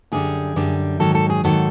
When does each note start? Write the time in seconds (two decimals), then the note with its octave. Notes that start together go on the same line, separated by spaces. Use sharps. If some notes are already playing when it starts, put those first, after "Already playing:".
0.12 F#2 D3 G3 G#4
0.56 F#2 D3 G3
1.00 G#2 D#3 F#3 A4
1.15 A4
1.30 G#4
1.44 G#2 D#3 F#3 A4